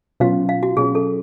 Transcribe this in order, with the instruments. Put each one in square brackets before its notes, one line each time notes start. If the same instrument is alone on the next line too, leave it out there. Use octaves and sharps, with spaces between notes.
[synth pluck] B2 F#3 C#4 F4 [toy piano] F5
[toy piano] F5
F#4
[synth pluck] B2 F#3 C#4 F4 [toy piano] G#4
[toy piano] A4